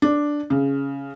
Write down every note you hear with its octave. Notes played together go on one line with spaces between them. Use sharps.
D4
C#3